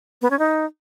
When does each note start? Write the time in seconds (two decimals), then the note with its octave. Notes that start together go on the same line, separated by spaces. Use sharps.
0.22 B3
0.30 C#4
0.39 D#4